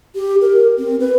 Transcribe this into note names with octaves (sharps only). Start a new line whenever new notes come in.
G4
A#4
C4
B4